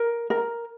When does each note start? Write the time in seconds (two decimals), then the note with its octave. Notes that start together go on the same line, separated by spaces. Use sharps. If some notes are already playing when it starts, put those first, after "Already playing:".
Already playing: A#4
0.30 A#4